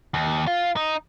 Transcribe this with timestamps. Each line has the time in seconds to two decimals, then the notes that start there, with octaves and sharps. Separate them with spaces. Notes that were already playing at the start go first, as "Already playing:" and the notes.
0.14 D#2
0.47 F4
0.77 D#4